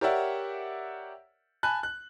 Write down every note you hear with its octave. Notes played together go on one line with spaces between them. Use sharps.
G4 A#4 C#5 D5 E5 F#5
G#5 A5 B5 F#6
F#6